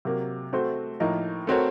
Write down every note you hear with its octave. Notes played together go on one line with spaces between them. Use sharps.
C3 F#3 A#3
A3 C4 F#4 C5
A2 F3 A#3 D#4 A#4
A3 C4 F#4 A#4 C#5